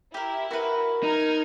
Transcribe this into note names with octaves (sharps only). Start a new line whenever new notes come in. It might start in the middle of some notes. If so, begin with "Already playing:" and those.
E4 G4 A#4
F#4 A#4 B4
D#4 A#5 F6 G#6